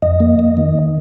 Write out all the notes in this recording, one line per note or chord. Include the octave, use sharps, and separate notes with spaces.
F2 D#5
A#3
F2
D#3